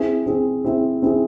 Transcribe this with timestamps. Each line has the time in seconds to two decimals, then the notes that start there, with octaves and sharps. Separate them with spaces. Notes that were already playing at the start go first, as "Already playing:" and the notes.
Already playing: C4 E4 G#4
0.26 C4 E4 G#4
0.65 C4 E4 G#4
1.02 C4 E4 G#4